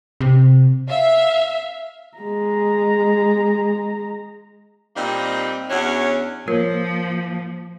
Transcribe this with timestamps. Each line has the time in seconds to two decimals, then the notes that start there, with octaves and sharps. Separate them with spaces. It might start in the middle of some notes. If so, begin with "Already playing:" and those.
0.21 C3
0.88 E5 F5
2.18 G#3 A#5
4.96 A#2 G3 A#3 C4 D#4
5.70 E2 C#4 D4 F#4 C#5
6.48 F3 A#3 F4 A#4 C#5